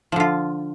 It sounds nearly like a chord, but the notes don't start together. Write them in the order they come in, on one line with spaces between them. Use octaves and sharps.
F3 D3 F4